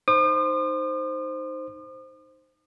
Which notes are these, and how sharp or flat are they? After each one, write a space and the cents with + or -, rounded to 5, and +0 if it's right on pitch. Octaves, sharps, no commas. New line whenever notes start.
D#4 +0 C5 +0 D#6 -45